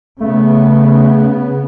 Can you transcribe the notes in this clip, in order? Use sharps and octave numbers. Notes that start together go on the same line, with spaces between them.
C#3 A3 B3